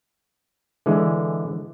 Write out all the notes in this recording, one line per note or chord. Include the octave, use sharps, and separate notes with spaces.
D3 E3 G#3